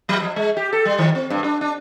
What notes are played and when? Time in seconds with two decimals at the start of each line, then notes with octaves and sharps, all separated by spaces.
0.09 F#3
0.22 F3
0.36 G#3
0.57 G4
0.73 A4
0.85 G3
0.98 D#3
1.15 C4
1.30 G2
1.44 D4
1.61 D4